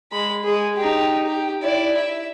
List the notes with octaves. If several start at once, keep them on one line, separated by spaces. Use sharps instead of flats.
G#3 B5
G#3 G#4
D#4 G4
G4
E4 D5
E5